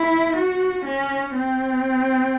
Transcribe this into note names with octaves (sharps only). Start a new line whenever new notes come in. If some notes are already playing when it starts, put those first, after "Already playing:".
Already playing: E4
F#4
C#4
C4